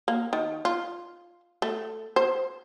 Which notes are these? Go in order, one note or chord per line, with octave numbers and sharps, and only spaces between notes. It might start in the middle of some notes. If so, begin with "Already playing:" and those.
A#3
D#3
F4
A3
C5